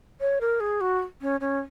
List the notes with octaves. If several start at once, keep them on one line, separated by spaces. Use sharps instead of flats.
C#5
A#4
G#4
F#4
C#4
C#4